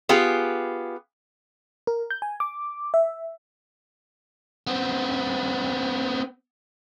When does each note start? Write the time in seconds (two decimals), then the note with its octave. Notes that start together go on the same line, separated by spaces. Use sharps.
0.09 B3 F4 G4 G#4
1.87 A#4
2.11 G6
2.22 G#5
2.40 D6
2.94 E5
4.67 B3 C4